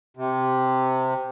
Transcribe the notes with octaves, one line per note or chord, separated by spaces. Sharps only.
C3